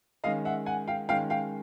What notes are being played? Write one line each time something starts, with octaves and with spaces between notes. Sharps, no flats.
D#3 G#3 C#4 D#5 F5
E5 F#5
F#5 G#5
F5 G5
D#3 G#3 C#4 F5 G5
F5 G5